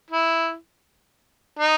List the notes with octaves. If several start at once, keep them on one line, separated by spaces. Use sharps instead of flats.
E4
D#4